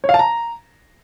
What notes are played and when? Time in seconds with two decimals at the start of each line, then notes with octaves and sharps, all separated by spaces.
0.04 C#5
0.09 F5
0.14 A5
0.19 A#5